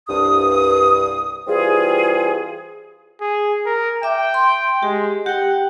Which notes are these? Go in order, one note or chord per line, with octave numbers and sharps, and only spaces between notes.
C2 G2 D#6
E3 G3 C4 F4 G#4
G#4
A#4
E5 G5 D6
C6
G#3 G4
G4 F#5 G5